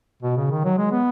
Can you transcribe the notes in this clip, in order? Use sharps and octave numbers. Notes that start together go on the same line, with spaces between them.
B2
C#3
D#3
F#3
G#3
B3